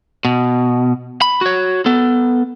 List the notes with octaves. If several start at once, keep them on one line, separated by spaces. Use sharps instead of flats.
B2
B5
F#4 C#5
B3 A4